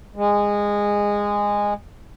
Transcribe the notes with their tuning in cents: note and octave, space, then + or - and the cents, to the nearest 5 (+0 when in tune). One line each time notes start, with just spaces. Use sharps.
G#3 -15